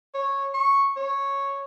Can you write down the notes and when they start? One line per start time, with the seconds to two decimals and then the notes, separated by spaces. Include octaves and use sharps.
0.14 C#5
0.54 C#6
0.97 C#5